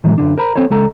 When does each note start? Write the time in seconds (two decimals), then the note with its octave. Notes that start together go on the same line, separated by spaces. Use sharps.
0.04 A2 D#3 E3 F#3 G#3
0.18 F#2 D3 D4
0.38 A#4 C5 A#5 B5
0.55 C4 A4 C5 C#5
0.70 C#2 G#3 A4 A#5